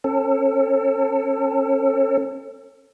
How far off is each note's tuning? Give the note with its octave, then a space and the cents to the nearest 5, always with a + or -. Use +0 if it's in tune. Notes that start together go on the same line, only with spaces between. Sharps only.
C#4 -35 A4 +25